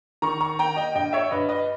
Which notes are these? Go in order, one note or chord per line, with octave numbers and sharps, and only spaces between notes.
D#3 A#5 C#6
A#5 C#6
A#3 G5 A#5
D#5 G5
G2 D#5 G5
C#5 E5
G2 B4 D#5
B4 D#5